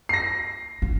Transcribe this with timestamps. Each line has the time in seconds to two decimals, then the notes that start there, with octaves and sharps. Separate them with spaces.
0.09 A#6 C7
0.82 C#4